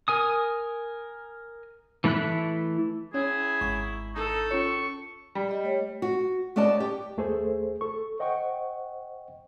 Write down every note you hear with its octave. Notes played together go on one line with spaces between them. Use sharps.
A#4 G#5 D#6
E3 A3 E4 B5 F#6
C#4 E4 G#4 C#5
G#1 C#6
D#4 A4
C#4 F4 C#5 C#6
G3
G4 D#5
A3 C#5
F#4
A3 B3 C#4 D5 D#5 A5
G4
D#2 A3 G#4 A4 C5
A4 C#6
C5 D#5 F#5 G5 C#6